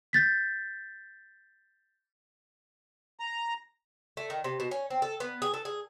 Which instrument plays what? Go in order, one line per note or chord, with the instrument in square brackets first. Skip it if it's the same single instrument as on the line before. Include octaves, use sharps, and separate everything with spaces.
[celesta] G6 A6 B6
[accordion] A#5
[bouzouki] A3
D#3
C3
B2
C#4
C4
A4
B3
G#4
A4
G#4